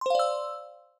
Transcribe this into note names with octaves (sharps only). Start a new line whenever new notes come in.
C5 D5 F5 C6 E6